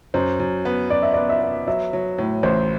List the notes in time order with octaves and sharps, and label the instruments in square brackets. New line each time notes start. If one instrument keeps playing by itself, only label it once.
[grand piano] F#2 [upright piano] C5
[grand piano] F#2
B3
[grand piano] F#2 [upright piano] D5
[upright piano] E5
D5
[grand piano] B3
[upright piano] E5
[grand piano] B3
[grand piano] F#3 [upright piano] E5
[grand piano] F#3
A2
[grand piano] A1 [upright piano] C5